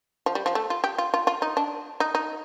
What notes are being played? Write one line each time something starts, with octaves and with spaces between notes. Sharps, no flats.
F3
G3
F3
A3
F4
G4
F4
F4
F4
D#4
D4
D#4
D#4